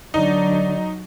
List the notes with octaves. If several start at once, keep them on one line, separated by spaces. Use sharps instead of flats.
D3 F#3 D#4 D5